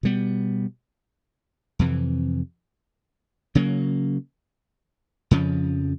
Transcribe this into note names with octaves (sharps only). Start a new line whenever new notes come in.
B2 G3 B3
F2 C3 E3
C#3 F#3 A#3
F2 C#3 F3